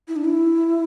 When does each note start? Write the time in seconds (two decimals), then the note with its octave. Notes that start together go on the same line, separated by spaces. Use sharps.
0.08 E4
0.16 D4
0.25 E4